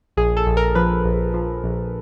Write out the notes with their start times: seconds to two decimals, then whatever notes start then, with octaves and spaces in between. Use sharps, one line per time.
0.17 A#1 G#4
0.37 A4
0.46 A#1
0.57 A#4
0.75 F3 B4
1.05 A#1
1.34 F3
1.64 A#1